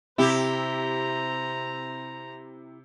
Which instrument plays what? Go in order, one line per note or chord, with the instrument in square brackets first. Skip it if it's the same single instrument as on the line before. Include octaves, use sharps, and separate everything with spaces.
[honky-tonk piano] C3 [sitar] E4 G4 [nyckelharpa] C5 A#5